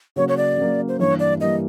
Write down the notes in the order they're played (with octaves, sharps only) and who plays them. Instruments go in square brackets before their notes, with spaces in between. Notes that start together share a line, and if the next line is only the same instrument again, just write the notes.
[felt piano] C#3 F#3 A#3 [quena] C#5
[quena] C#5
D5
[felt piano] C#3 F#3 A#3
[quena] C5
[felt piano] G2 E3 G3 A#3 [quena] C#5
[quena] D5
[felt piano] E3 G3 A#3 [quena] D#5